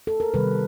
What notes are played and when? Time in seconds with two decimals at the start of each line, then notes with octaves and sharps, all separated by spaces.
0.07 A4
0.20 A#4
0.34 C3 D#3 G3 B4